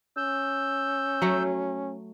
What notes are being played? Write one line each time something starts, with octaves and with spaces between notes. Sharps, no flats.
C#4 E6 G6
F#3 A3